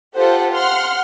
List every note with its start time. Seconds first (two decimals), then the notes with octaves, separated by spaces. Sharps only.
0.16 F4 G4 A4 C5 F#5
0.52 F#5 C6 F6